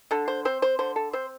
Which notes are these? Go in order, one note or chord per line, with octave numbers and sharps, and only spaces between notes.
D3 A4
C5
C4 C5
C5
D3 C5
A4
C4 C5